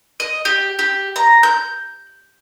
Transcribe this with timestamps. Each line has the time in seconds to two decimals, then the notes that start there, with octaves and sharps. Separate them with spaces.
0.20 D#5
0.45 G4
0.79 G4
1.16 A#5
1.43 G6